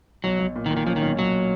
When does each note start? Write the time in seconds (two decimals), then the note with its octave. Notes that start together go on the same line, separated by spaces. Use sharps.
0.24 B1 F#3
0.39 B1
0.56 A#2
0.66 D#3
0.71 A#2
0.77 D#3
0.87 F3 C#4
0.96 D#3
1.02 B1
1.19 B1 F#3